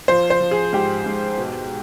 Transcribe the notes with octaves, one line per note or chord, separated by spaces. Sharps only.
F3 C5
C5
F3
G#4
G#2 G4
G#2
B2